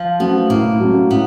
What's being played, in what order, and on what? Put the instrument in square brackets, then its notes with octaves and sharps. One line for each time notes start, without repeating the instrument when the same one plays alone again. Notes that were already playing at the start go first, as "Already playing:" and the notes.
Already playing: [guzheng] F3
[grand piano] F#3 A3 C#4 [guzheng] B3
[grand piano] A2 [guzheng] A#3
[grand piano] F#3 A3 C#4
[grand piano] A2 [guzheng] B3